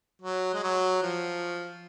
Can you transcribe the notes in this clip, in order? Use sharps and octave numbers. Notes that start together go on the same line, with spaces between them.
F#3
G#3
F#3
F3